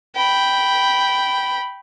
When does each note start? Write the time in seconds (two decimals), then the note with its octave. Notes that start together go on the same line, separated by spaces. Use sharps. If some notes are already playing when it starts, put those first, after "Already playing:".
0.16 G5 B5